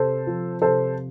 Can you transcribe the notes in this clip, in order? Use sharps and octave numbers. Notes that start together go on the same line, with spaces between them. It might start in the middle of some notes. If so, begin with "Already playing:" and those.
Already playing: C3 A4 C5
F3
C3 A4 C5